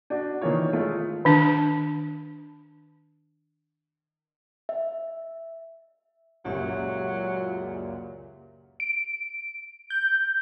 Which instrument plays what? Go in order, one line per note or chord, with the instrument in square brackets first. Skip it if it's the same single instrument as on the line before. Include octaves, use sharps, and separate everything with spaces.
[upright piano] D4 F#4
D#3 E3 A#3 F4 C#5
G#3 A3 E4 F4
[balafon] D#3 D4 A5
[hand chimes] E5
[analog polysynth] C#2 F#2 A#2 [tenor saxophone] F#3 [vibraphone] G4 E5
[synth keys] D7
G6